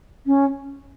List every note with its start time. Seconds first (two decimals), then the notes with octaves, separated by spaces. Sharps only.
0.27 C#4